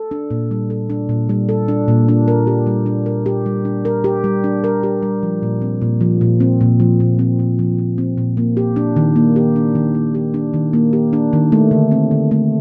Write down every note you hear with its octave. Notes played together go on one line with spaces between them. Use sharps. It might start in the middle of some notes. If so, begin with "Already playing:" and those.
Already playing: A4
D4
A#2
G3
A4
D4
A#2
G3
A4
D4
A#2
D4
A#4
G4
G3
D4
A#4
G4
G3
D4
A#4
G4
G3
D4
A#4
G4
G3
F3
A#2
C4
A#2
F3
A#2
C4
A#2
F3
A#2
C4
A#2
F3
A#2
C4
A#2
A#3
G4
D4
D#3
A#3
G4
D4
D#3
A#3
G4
D4
D#3
A#3
G4
D4
D#3
A3
D3
C4
D3
A3